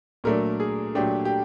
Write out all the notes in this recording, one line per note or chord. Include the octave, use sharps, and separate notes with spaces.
A#2 F#3 A3 D4 A#4
G#4
A#2 F#3 A3 D4 G4
G4